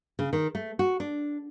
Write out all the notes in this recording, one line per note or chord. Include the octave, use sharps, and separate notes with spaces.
C#3
D#3
A3
F#4
D4